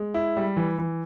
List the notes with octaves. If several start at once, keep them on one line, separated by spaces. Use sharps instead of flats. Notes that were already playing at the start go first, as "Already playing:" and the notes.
Already playing: G#3
E4
G3
E3
E3